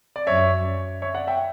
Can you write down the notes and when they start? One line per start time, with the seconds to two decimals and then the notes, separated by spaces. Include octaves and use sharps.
0.16 D5
0.27 F#2 C#5 E5
1.02 C#5 E5
1.14 D5 F#5
1.27 E5 G5